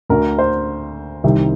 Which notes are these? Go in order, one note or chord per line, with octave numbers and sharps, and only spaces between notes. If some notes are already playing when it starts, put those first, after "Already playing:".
D2 D3 A#4
C5
C2 C3 D#3